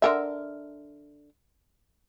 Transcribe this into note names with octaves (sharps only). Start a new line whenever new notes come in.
D3 A#4 E5